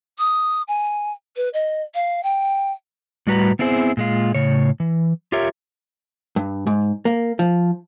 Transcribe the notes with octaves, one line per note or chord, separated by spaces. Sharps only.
D#6
G#5
B4
D#5
F5
G5
A2 G3 F#4 B4 A#5
B3 C4 E4 G#4 C5
A#2 G#3 F4
A2 C#3 C#5
E3
F4 G4 A#4 C#5 E5
G2
G#2
A#3
F3